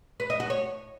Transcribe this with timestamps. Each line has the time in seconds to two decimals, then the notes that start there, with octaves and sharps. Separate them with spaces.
0.20 B4
0.30 D#5
0.40 F#4
0.50 C#5